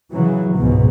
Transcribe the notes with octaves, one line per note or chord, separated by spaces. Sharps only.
C#3 E3 F#3
C#2 G#2 B2